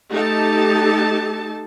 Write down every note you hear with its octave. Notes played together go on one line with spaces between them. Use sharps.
A3 D#4 G4 A4 A5